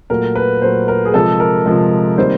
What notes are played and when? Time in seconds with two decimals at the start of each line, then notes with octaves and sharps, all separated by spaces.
0.10 A#2 F#3 A3 A#4
0.35 B4
0.62 A#2 F#3 A3 C5
0.88 A#4
1.05 G#4
1.14 C3 F3 G#3 A4
1.40 A#4
1.66 C3 F3 G#3
2.18 C3 D#3 G3 A#3 C5